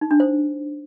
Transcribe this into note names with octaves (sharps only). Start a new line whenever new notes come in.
D#4
D4
C5